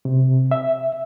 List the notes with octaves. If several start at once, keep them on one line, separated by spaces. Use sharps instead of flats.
C3
E5